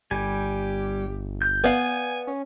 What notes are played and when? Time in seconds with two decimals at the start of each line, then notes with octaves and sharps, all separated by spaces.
0.11 G1 G3 G4 G#5
1.42 G6
1.64 B3 D5 F5 G#5
2.27 C#4